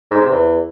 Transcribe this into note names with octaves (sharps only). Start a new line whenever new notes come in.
G#2
C3
E2